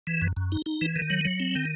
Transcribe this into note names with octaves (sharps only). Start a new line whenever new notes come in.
E3
F#2
F#2
D#4
D#4
E3
D#3
F#3
F#3
C4
D#3